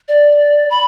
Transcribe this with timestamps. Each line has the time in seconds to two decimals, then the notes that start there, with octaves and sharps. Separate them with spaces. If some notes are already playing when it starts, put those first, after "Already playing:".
0.08 D5
0.70 B5